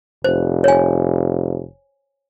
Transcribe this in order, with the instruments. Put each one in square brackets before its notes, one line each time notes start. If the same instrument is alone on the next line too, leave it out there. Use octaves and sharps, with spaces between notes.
[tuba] F1 [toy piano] C5
[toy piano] C#5 G#5